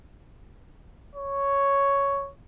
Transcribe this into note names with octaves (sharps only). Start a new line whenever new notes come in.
C#5